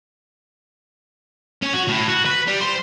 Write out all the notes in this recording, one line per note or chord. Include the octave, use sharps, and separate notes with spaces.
C#4
F#4
A2
F#4
B4
G3
C5